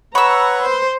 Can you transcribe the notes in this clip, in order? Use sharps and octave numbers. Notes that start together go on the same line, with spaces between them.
B4 C#5 F#5 A#5 B5 C#6 E6
C5